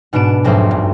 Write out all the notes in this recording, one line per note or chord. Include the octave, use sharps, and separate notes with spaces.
G#2 B2 B3 D4 D7 E7
B1 F2 G#2 A3 C5 E5
G2